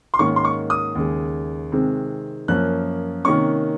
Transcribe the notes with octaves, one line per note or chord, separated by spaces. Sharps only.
C6
G#2 D#3 A#3 C#4 C#6
C6
C#6
D#6
D#2 C#3 G#3
C3 D#3 G#3 C4
F#2 F3 A#3 C#4 F#6
C3 D#3 A#3 C#4 C#6